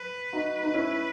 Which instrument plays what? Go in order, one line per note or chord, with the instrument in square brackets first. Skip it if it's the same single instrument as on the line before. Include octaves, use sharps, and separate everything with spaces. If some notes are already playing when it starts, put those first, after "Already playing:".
Already playing: [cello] B4
[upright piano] D#4 F#4
D#4
C#4 E4